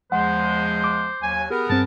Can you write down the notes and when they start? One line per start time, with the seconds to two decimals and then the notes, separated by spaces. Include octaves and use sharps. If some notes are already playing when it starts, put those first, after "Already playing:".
0.12 E2 F3 G#3 C5 F#5
0.84 D6
1.22 D#2 F#3 G#5
1.50 B3 G4 G#4 A#4
1.70 G2 C4 A5